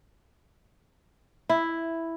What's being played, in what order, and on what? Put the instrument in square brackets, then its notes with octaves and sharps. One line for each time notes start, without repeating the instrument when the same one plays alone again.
[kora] E4